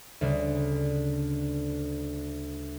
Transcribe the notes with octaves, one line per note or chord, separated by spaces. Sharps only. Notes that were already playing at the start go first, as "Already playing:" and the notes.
D2 C#3 G3 D4